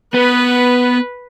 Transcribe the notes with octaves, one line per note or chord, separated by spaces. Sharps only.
B3 B4